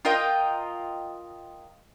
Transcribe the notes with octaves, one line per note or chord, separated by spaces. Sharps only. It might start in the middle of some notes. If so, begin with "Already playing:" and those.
F4 A#4 D#5 G5